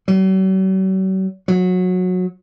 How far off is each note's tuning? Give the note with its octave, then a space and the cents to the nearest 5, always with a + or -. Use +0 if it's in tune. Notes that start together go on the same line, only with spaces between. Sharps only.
F#3 +45
F#3 -20